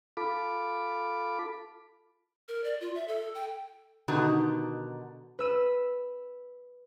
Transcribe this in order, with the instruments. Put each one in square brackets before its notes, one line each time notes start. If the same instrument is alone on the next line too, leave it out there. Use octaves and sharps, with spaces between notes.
[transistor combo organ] F4 A4 B5 D6
[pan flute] A#4
D5
F4
E5
A4
G5
[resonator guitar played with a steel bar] B2 D3 D#3 D#4 F#4 G4
[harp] B4 E6 D#7